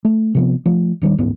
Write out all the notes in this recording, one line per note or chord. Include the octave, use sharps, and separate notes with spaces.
A3
C3 F3 B3
F3 A3
D#1 D#3 G3 D4
D1 A1 G#2 B3